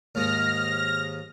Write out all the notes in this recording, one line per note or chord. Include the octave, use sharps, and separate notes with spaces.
D#2 G#2 F6 A#6